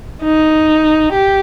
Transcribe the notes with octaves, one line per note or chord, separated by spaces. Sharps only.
D#4
G4